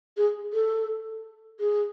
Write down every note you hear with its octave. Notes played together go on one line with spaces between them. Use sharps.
G#4
A4
G#4